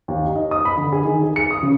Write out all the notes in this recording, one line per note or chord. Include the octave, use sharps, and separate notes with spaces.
D#2
D#4
D#5
D#6
B5
D3
G#4
D#3
G#4
C#7
D#6
C#3